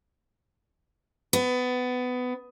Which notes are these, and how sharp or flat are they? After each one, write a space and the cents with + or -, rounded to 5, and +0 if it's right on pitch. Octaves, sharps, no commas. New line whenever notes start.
B3 +20